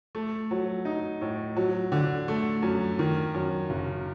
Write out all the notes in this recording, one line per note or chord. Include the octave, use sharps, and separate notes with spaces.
A3
F#3
D#4
A2
F#3
D3
A3
F#2
D#3
F#2
F#1